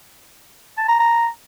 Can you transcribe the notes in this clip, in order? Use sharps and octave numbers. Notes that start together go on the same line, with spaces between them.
A5
A#5
A#5